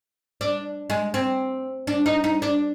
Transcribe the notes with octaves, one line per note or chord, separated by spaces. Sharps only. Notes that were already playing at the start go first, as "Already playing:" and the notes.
D4
G#3
C4
D4
D#4
D#4
D4